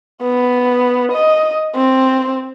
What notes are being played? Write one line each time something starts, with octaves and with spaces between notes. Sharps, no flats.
B3
D#5
C4